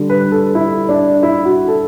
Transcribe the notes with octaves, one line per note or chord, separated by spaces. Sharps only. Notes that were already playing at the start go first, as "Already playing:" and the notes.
Already playing: D3 G3
B4
A4
E4
D4
E4
F#4
A4